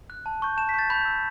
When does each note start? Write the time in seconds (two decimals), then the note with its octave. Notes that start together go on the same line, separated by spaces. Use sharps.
0.10 F#6
0.26 A5
0.42 C#6 G6
0.57 A5 E7
0.69 B6
0.74 C#6 G6 A6
0.90 B5 G6
1.05 E6 G6